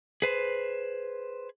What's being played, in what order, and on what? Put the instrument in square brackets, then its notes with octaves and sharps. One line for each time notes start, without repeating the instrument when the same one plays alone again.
[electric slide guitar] G#4 B4 C5